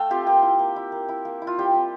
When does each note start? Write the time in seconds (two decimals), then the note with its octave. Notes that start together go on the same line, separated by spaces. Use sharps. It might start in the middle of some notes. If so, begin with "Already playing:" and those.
Already playing: A3 A4 F5 G5 A5
0.10 C4 F4 G4
0.27 A#3 G4
0.43 E4
0.59 A#3
0.76 E4
0.92 A#3
1.09 E4
1.25 A#3
1.42 E4
1.47 F4
1.58 G3 G4
1.74 C4 E4